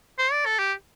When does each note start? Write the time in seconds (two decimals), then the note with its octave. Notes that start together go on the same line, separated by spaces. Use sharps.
0.18 C5
0.32 D5
0.46 A4
0.59 G4